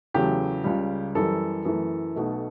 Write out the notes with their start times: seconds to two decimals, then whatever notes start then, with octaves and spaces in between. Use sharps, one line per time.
0.14 E2 C#3 F#3 A3 G4
0.64 C#2 C#3 G3
1.15 F#2 E3 G3 A4
1.65 F#2 E3 A3
2.16 B1 B2 A3